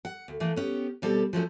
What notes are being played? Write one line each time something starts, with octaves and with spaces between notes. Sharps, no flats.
F#5
D2
E3 A3 A#3
B3 C#4 G4
B2 G3 C4 A4
F3 F#3 A3 C#4